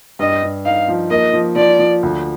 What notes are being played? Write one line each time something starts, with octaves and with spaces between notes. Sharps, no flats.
G2 D#5
G2
D#4 F5
F3
A#3 D#5
F3
F3 D5
F3
D2